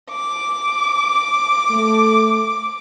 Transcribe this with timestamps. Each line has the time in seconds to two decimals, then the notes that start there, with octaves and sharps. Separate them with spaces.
0.11 D6
1.71 A3